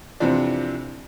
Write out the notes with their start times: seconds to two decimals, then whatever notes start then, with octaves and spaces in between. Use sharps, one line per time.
0.20 F2 C3 E3 C4 D4